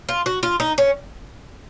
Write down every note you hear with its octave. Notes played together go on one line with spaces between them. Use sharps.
F4
F#4
F4
D#4
C#4